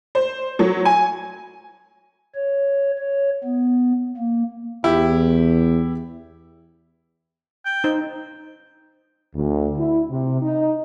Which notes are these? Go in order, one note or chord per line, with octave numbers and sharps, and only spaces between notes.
C5
F#3
G#5
C#5
C#5
B3
A#3
E2 E4 G4
G5
D#4 C5
D2
E4
C3
D#4